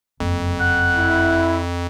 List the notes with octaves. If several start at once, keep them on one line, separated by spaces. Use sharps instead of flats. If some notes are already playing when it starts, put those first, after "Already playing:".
F#1 F2
F#5
E4